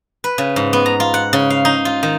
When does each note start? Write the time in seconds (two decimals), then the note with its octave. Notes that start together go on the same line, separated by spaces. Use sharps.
0.24 B4
0.38 C#3
0.56 G#2
0.73 B3
0.86 A#5
1.00 F4
1.14 F#5
1.33 C#3
1.50 F5
1.65 D#4
1.85 F4
2.03 D#3